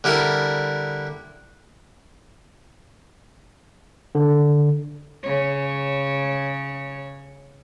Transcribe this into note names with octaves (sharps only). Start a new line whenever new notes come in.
D3 G3 E4 A#4
D3
C#3 C#5